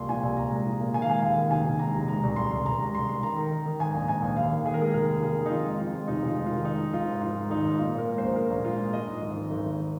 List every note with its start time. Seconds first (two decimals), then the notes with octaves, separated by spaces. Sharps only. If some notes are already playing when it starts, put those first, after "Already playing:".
Already playing: C2 A#2 G#3 C6
0.09 F3 G#5
0.23 C2
0.37 C2 A#5
0.51 G#3
0.66 F3
0.80 A#2
0.94 D#3 G#5
1.02 F5
1.08 G#3 G#5
1.22 D#2 F5
1.37 D#3
1.51 F1 G#5
1.66 F1
1.79 G#3 A#5
1.94 F1
2.08 G#3 A#5
2.23 C2
2.36 C2 C6
2.51 C2
2.65 C2 A#5
2.80 G#3
2.93 C2 C6
3.08 G#3
3.23 D#3 A#5
3.37 D#3
3.51 D#3
3.66 D#3
3.79 G#2 G#5
3.94 A#1
4.08 G#2 G#5
4.22 A#1
4.36 D#2 F5
4.51 D#3
4.65 D#3 G#4
4.74 A#4
4.79 G#3 G#4
4.94 F1 A#4
5.08 D#2
5.23 D#3 G#4
5.37 D#3
5.46 D#4
5.50 F2 F4
5.65 G#3
5.80 F2 F4
5.94 G#3
6.07 F1 D#4
6.22 F1
6.28 F4
6.36 G#3
6.46 F4
6.51 D#3
6.65 G#3 D#4
6.79 F3
6.93 G#1 F4
7.08 G#2
7.22 F3 F4
7.36 G#3
7.50 G#1 D#4
7.65 G#2
7.79 A#2 F4
7.93 A#2
7.98 A#4
8.07 G#3
8.18 A#1 C5
8.36 A#2 A#4
8.50 A#1
8.65 G#3 F4
8.79 G#3
8.93 G#3 D#5
9.08 G#2
9.21 G#1
9.37 G#1
9.51 G#1
9.65 G#1